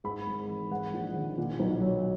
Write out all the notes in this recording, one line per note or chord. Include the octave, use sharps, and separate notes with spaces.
G#2 B5
G#1
E3
G#2 F#5
A#1
D#3
A#2
B1
F#3